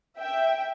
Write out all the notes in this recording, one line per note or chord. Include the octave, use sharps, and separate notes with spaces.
E5 G5